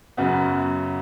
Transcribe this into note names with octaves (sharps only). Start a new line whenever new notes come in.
F#2 C#3 F#3 B3